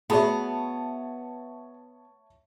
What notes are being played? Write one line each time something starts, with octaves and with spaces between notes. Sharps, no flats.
B3 F#4 G#4 C#5 E5 A5 B5